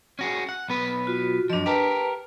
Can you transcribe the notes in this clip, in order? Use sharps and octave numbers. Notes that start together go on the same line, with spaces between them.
C#4 F#4 G#4
F#5
B1 B3 B4
F4 F#4
F#2 F3 D4 D#5
G4 A#4 B4 A5